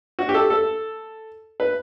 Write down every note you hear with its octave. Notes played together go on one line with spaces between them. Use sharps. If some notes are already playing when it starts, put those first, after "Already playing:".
F#4
G4
A4
A4
B4